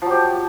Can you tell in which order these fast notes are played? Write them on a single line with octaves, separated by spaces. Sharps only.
F3 F#3 G4